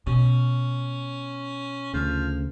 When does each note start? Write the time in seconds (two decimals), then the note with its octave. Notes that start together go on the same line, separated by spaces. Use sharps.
0.07 B2 C#4
1.94 D2 C#3 F3